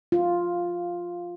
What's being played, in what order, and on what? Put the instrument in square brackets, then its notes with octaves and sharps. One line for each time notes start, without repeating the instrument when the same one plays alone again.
[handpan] F4